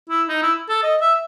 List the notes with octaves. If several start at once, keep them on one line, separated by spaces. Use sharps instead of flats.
E4
D#4
E4
A4
D#5
E5